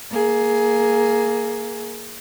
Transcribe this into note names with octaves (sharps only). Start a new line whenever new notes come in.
A#3 G#4